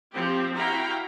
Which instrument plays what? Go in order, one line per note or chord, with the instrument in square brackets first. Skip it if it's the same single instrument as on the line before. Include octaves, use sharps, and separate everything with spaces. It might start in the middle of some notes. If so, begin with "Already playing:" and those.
[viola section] F3 C4 G4
E4 F#4 F5 G5 A#5 B5